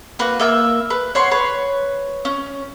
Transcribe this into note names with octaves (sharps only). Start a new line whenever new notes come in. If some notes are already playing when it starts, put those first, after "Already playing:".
A#3 F#4 B4
A#3 E5 G#5 E6
B4
C#5 F#5 C6
B4 C#5
C#4